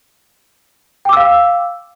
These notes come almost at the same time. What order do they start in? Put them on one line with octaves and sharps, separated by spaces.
G5 D6 E6 F5